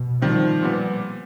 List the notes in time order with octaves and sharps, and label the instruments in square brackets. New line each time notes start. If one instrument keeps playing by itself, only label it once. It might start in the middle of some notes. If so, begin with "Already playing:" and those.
Already playing: [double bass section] B2
[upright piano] D#3 G3 C4 [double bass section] F3
[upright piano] A#2 G3 B3